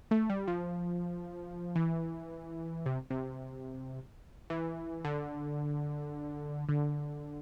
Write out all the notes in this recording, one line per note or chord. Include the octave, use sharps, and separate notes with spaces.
A3
G3
F3
E3
C3
C3
E3
D3
D3